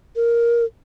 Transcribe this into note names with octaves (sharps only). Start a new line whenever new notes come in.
A#4